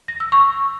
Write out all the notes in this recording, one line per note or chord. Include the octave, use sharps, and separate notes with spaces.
A#6
E6
C#6